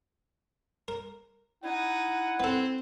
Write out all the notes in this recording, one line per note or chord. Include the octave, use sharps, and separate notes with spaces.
A#4
D#4 E4 F#5
B3 C4 A4